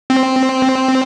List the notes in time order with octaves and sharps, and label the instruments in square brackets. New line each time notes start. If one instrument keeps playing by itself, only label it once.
[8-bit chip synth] C4